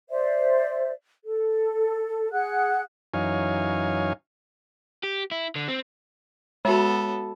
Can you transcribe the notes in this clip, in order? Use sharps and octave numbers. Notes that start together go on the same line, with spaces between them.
C5 D5 E5
A4
G#4 F#5 F#6
F#2 E3 D#4 C#5 F5 G#5
G4
E4
D3
C4
G#3 B3 F#4 A4 E5